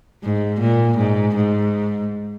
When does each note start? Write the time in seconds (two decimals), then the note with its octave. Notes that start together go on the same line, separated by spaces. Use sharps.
0.24 G#2
0.61 A#2
0.98 G#2
1.36 G#2